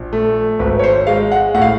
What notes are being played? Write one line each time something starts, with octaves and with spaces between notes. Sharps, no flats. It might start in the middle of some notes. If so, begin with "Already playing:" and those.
Already playing: A#1
A3
G#1 B4
C#5
C5
G#3 F5
F#5
A2 F#5
F5